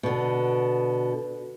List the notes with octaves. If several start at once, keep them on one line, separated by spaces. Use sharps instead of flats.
B2 D3